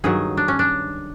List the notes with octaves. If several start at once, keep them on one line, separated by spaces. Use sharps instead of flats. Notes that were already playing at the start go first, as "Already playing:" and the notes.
G2 D#3 F#3 G#4
D4
C#4
D4